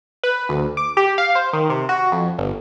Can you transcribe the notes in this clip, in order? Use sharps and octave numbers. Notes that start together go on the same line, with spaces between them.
B4
D2
D6
G4
F5
C5
D#3
C3
F#4
F2
G1